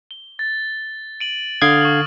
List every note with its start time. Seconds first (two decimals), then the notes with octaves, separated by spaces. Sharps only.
0.11 G7
0.39 A6
1.20 D7 D#7 F#7
1.62 D3 F5 D#6 F6 G#6 D7
1.81 C#6 F#7